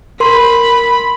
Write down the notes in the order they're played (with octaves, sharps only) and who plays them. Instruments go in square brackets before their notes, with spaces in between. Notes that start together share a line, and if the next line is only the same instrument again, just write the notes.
[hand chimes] A#4 C6 [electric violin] B5